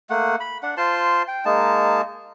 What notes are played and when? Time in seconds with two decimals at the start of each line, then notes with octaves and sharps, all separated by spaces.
0.10 A3 A#3 F#5
0.40 B5
0.63 D4 F#5
0.77 F4 C5 A5 C6
1.28 G5
1.45 G#3 A#3 D#4 A5